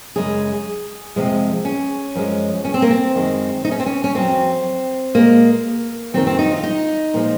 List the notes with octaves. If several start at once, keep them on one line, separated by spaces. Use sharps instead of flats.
F#2 C#3 G#3 G#4
F2 C3 F3 G#3
C#4
F#2 F3 G#3
C#4
C4
A#3
C4
F#2 D#3 G#3
D#4
C#4
C4
C#4
C#4
F2 D#3 F#3 C4
A#2 G#3 A#3
F#2 D#3 F#3 C4
C4
D#4
F4
D#4
A#2 F3 G#3